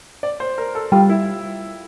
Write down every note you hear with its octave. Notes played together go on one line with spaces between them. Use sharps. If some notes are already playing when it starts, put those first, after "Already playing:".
D5
C5
A#4
A4
G3 F4
E4